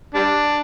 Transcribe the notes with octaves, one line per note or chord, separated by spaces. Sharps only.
G3 D4